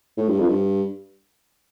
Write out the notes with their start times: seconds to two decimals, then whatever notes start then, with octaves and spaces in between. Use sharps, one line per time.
0.18 A2
0.29 G2
0.39 F2
0.49 G2